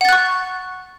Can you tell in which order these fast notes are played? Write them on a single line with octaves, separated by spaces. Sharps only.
F#5 A6 F#6 C#6